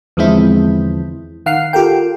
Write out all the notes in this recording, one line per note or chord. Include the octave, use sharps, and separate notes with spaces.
E2 D3 F3 G#3 C4 E4
D#3 F5 F#5 F6 C7
F4 G4 A4 A#4 G5